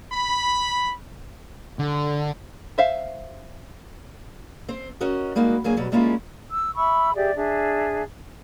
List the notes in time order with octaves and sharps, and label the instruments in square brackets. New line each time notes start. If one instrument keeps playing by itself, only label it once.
[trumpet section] B5
[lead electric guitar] D3
[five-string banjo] C5 E5 F5
[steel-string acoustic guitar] C4 C5
C#4 F#4 A#4 D#5
G3 G#3 A#3 D#4 F#4
G2 F#3 A#3 G#4 G#5
B2 F#3 G3
G3 G#3 A#3 C#4 E4 F4
[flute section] E6
E5 B5 C#6 E6
G4 G#4 D5 E5
D4 G#4 E5